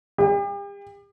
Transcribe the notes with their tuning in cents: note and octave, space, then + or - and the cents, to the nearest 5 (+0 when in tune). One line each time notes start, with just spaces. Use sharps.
G4 +40